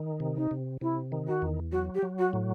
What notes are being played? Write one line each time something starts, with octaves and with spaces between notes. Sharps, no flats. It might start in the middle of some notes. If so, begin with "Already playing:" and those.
Already playing: D#3
C3
D#4
C3
C3 E4
D#3
F#4
E2
F#3 F#4
G4
F#3
F#4
A2